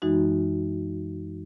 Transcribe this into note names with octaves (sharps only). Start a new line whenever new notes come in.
F#2 E3 G#3 D#4 F#4